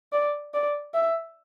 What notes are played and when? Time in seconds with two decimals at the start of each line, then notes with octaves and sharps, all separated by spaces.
0.12 D5
0.54 D5
0.94 E5